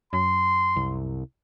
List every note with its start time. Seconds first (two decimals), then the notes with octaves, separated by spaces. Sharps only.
0.13 F#2 C6
0.76 C2